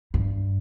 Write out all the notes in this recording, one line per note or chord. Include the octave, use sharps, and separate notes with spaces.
G2